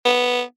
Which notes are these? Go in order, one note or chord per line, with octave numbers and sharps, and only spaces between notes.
B3